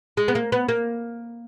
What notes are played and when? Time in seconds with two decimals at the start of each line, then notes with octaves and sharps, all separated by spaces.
0.17 G#3
0.28 B3
0.35 A#3
0.52 B3
0.69 A#3